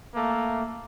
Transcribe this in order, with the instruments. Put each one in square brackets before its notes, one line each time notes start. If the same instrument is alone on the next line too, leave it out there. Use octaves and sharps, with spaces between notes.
[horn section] A3 A#3